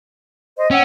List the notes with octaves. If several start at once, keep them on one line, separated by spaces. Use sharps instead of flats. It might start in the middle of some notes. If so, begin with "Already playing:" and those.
C5 D#5
C#4 F#5 G5 E6